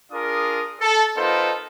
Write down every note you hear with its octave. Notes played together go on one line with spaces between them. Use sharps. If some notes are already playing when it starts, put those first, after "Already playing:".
D4 F4 G#4 A#4 D#6
A4
B3 D#4 F4 A4 A#4 C5